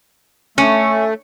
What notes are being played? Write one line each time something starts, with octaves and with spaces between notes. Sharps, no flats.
A3 C#4